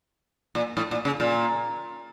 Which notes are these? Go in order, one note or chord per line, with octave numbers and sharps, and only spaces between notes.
A#2
A2
A#2
C#3
A#2